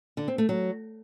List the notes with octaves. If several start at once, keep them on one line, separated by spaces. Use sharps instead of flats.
D3
C4
A3
F#3